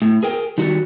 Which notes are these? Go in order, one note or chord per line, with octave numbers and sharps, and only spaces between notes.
A2
G#4 A#4 G5
D#3 G3 F#4